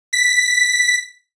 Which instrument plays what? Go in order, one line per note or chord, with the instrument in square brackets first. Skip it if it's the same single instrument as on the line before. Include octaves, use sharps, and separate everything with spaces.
[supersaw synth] B6